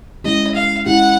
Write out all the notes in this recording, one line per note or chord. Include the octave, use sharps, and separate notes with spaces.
G#3 C#4 E4 G4 D#5
F5
G#3 C#4 E4 G4 F#5